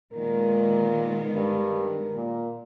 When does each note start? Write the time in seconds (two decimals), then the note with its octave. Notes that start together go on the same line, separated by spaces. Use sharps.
0.13 A#2 D#3 G#3 B3 A#4
1.35 G2
2.15 A#2